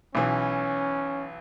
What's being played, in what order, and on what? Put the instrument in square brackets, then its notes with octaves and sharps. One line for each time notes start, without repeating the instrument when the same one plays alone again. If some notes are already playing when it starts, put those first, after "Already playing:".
[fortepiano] B1 E3 [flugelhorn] C#4